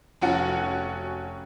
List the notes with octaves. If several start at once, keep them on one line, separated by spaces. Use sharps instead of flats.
F1 C#4 F#4 F#5